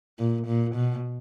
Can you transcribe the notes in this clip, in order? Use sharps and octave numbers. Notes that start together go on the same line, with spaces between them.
A#2
A#2
B2